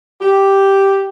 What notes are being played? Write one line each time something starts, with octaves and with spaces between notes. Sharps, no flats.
G4